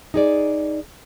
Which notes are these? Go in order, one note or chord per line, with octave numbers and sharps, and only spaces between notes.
D#4 G#4 D5